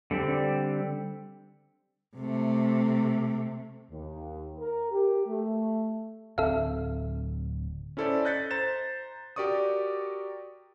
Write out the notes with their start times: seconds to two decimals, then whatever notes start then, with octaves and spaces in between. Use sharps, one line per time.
0.11 D3 G3 C4
2.17 C3 A3
3.90 D#2
4.58 A#4
4.91 G4
5.26 A3
6.38 D1 C4 A4 E5 F5
7.97 C#4 E4 A4 C5 D5
8.25 D#5 F#6 G6 A6 B6 C#7
8.51 C5 A#5 A6 E7
9.36 F#4 G4 A#4 D5 C#6 D#6